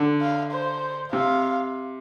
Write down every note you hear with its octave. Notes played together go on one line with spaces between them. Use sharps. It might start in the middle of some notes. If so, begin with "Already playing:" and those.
Already playing: D3
F5
C5
C3 F5